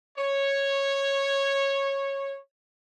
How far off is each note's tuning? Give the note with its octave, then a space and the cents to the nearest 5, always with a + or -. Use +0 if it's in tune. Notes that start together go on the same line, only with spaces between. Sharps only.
C#5 -10